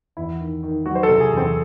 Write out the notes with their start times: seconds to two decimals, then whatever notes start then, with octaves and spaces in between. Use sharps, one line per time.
0.17 E2 E4
0.40 D#3
0.63 D#3
0.86 F#3 F#4
0.95 C5
1.03 A4
1.09 C3
1.20 G#4
1.32 E2
1.37 C4